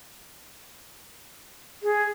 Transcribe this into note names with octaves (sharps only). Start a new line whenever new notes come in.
G#4